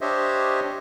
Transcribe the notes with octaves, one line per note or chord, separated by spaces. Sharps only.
D4 G4 C5 C#5 D#5 E5